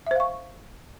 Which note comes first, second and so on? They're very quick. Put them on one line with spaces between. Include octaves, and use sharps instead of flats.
E5 C5 F5 C#6